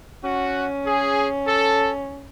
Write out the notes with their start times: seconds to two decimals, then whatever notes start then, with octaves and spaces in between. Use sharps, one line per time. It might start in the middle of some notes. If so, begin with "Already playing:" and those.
0.23 C#4 F#4
0.86 G#4
1.47 A4